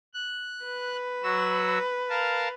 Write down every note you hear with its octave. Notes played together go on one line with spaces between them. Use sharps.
F#6
B4
F#3 F#4 E6
A#4 F5 A5